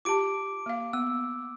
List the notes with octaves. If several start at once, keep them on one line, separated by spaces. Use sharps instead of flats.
F4 G4 A5 D6 D7
A#3 F5
B3 E6